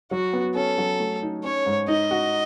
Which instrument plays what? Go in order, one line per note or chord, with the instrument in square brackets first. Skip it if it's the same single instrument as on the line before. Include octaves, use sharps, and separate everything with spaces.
[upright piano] F#3 [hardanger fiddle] F#4
[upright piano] B3
[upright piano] C#4 [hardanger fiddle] A4
[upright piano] F#3
A3
D#4
[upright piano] C#4 [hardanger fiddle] C#5
[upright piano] G#2
[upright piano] D#4 [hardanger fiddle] D#5
[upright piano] F#4